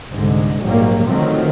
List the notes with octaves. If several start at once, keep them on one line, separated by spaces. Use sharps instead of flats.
C2 G#2 D3 G#3
A#1 G#2 F#3 G3 A#3
D3 D#3 F3 F#3 A3 C4